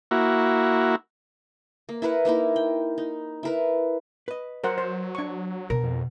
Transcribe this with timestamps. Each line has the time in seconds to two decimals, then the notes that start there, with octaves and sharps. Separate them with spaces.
0.11 A#3 E4 F#4
1.89 A#3
2.02 E4 A#4 B4 F#5
2.25 A#3 D#4 E4 A#4
2.56 G5
2.98 D#4
3.43 E4 A#4 B4
4.28 B4 D#5
4.64 F#3 A#4 C5 F#5
4.78 C5
5.15 D4 C#6
5.70 B2 A#4
5.83 F2